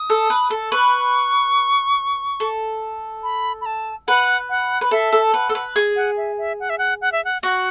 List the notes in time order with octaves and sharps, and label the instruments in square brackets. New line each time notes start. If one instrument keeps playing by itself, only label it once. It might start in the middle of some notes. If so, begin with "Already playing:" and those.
Already playing: [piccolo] D#6
[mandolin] A4
B4
A4
[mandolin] B4 [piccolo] C#6
[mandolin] A4
[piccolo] B5
B5
A5
[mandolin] B4 [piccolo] F#5
[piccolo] F#5
[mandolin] B4
[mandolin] A4 [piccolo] E5
[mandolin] A4
[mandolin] B4 [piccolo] F#5
[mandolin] A4
B4
G#4
[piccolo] F#5
E5
E5
F#5
E5
F#5
F#5
E5
F#5
[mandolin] F#4 [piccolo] F#5